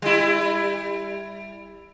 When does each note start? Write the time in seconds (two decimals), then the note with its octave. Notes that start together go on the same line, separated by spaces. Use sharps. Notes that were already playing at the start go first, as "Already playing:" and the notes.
0.02 G3 E4